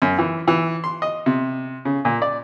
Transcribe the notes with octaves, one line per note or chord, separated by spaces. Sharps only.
F#2
E3
E3
C6
D#5
C3
C#3
A#2
D5